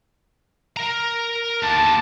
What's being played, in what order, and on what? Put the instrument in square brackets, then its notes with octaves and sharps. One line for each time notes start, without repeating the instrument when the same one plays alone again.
[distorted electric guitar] A#4 A#5
[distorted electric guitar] D#2 D3 [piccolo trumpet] A5